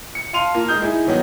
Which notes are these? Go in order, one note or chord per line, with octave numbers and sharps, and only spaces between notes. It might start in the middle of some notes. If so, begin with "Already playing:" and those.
C#7
F5 A5 C6 D#7 F7
A#3 F4
G#3 D#4 D#6 G6
D#4 E4 G#4
D#3 F#3 B3 D#4